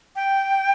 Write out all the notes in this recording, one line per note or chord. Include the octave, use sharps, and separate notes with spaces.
G5